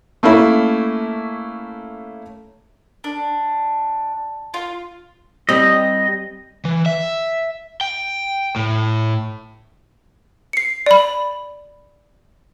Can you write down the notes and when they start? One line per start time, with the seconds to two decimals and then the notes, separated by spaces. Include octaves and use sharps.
0.23 A3 A#3 C#4 E4
3.04 D4
4.54 F4
5.49 G3 C4 D#5
6.65 E3
6.86 E5
7.81 G5
8.56 A2
10.53 C7 C#7
10.86 D5 B5